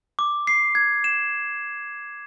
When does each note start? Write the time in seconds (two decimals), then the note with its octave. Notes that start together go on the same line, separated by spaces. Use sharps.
0.19 D6
0.47 C7
0.75 G#6
1.04 E7